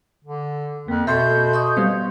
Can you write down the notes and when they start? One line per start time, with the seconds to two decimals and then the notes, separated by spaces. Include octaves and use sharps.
0.24 D3
0.88 F2 A#3
1.07 B2 A4 E5 C6 C#6 G6
1.53 D#5 C6 C#6 D#6
1.77 G3 B3 C4 F5